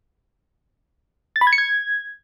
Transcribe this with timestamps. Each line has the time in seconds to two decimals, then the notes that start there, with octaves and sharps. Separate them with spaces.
1.36 A6
1.41 B5
1.47 G#6
1.53 C#7
1.58 G#6